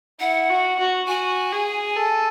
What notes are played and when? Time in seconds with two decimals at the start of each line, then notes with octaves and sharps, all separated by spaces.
0.20 E4 F#5
0.49 F#4
0.79 F#4
1.08 F#4 G#5
1.52 G#4
1.96 A4